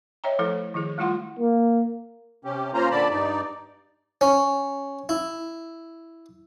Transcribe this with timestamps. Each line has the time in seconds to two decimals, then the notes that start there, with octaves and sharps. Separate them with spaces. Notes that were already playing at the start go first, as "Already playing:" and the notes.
0.24 C#5 D#5 E5 G5 A#5
0.39 F3 A3 E4 A4 C5 C#5
0.74 D#3 F3 E4 G#4
0.98 G3 A3 E4 F4 F#5 C6
1.39 A#3
2.45 C3 C#4 G4
2.74 A#3 C#4 F4 C5 A#5
2.91 A#2 D3 D5 A5 B5
3.10 G2 D#4 D5
4.21 C#4
5.09 E4